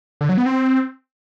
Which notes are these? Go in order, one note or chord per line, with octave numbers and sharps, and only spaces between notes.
D3
F#3
B3
C4